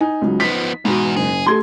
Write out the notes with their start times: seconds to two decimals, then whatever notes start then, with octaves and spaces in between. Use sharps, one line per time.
0.01 D#4 G#5
0.22 C#2 F#3
0.40 F3 B3 B6
0.85 E2 G#2 B2
1.17 F#1 G#4
1.46 A3 G4 A4 C6 G#6